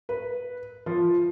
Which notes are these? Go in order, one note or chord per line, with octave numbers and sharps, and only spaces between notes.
B4
F3